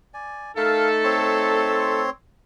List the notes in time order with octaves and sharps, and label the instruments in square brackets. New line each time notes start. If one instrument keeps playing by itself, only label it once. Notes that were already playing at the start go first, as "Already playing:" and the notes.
[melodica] D5 G#5
[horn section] A3 D#4 A4 [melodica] A#4 F5
[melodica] C4 C#5 C6